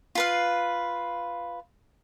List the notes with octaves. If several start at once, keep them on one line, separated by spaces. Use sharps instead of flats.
F4 B4 F5